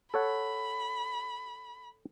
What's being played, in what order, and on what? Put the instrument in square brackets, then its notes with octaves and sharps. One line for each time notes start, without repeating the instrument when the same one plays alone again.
[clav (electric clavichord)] A4 C#5 F#5 [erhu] B5